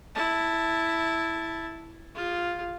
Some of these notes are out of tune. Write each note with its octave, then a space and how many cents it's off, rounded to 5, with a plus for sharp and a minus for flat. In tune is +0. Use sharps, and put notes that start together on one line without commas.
E4 +0 A5 +0
F4 +0 G#4 -45